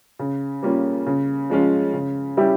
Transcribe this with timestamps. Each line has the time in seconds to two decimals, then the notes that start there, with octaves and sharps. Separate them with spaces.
0.19 C#3
0.63 G3 A#3 C#4 F4
1.06 C#3
1.50 F3 G#3 C#4 F4
1.94 C#3
2.37 G3 C#4 E4 G4